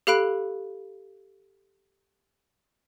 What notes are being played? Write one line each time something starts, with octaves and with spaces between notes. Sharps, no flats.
G4 A4 F5 B5 F#6 D7